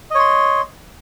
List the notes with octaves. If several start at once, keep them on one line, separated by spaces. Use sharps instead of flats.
C#5 D#5 C6